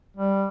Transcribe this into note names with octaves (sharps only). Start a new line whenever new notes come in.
G3